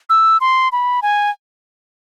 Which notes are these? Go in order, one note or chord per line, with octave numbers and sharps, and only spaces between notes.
E6
C6
B5
G#5